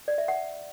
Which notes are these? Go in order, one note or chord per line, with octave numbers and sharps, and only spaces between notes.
D5
E5
F#5